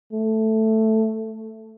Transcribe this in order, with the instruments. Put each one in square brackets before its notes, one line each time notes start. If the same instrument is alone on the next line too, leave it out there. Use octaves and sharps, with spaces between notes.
[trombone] A3